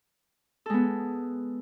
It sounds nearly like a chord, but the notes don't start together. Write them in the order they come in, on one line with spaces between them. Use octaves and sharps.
A4 G#3 B3